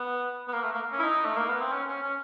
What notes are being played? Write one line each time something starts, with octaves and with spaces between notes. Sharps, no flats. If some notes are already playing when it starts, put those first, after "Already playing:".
Already playing: B3
B3
A#3
A3
A#3
C#4
E4
D#4
A3
A#3
B3
C4
C#4
C#4
C#4